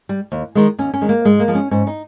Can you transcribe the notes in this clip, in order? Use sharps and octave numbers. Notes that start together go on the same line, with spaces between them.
G3
D#2
D#3 G#3
D#2 C#4
C#4
D#3 G#3
A#3
G#2 G#3
A#3
F3 G#3
C#4
G#2 C#4
D#4